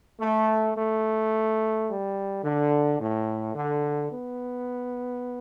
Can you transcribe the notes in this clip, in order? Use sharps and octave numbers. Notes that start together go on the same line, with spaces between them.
A3
A3
G3
D3
A2
D3
B3